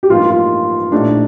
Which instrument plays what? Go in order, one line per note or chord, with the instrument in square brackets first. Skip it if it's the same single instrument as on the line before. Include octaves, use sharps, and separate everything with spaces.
[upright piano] G4
[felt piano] A1 G2 F3 A#3 D#4 [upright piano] F4
[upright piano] F4
[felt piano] A#1 A2 A3 D#4 G4 [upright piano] D4